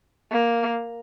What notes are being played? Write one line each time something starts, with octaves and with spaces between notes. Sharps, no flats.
A#3